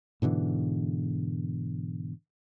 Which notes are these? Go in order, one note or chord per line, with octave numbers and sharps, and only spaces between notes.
G#2 B2 D3 E3